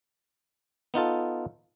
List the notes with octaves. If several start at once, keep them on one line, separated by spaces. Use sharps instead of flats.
B3 D#4 F4 A4